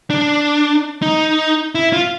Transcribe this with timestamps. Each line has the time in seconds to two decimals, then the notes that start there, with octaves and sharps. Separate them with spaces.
0.10 D4
1.02 D#4
1.75 E4
1.93 F4